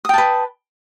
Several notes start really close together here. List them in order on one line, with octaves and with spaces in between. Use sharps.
D#6 G5 A5 B4